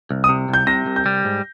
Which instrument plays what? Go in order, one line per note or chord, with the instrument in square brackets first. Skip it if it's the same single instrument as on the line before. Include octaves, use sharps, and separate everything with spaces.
[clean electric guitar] C2
[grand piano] D#6
[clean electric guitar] C3
[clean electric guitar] C2 [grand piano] G6
[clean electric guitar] C3 [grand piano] A#6
[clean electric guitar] C2
[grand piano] G6
[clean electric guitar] G3
G#2